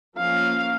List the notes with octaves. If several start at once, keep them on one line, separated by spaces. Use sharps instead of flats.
F3 A#3 C#4 F5